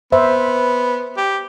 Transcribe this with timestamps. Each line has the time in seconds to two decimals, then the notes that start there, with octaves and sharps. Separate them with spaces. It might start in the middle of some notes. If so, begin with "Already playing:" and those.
0.12 B3 C5 E5
1.17 G4